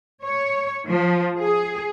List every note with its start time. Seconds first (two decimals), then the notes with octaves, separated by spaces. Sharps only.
0.24 C#5
0.86 F3
1.38 G#4